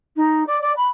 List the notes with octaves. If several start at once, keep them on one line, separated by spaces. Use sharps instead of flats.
D#4
D5
D5
B5